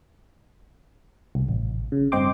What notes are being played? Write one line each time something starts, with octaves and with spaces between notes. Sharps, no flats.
C2
A1
C#3
G2 C4 D#5 G5 C6 D6